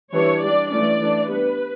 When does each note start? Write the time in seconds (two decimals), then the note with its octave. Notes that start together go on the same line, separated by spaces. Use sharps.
0.13 E3 G3 D4 C#5
0.42 G3 D4 D5
0.71 E3 A3 C#4 D5
1.00 E3 A3 D4
1.29 G3 B3 D4 B4